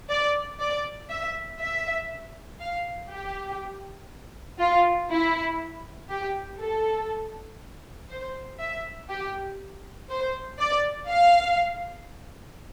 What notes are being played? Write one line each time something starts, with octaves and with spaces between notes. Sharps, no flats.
D5
D5
E5
E5
F5
G4
F4
E4
G4
A4
C5
E5
G4
C5
D5
F5